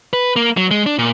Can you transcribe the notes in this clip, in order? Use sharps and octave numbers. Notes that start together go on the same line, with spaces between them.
B4
A#3
F#3
G#3
D4
A#2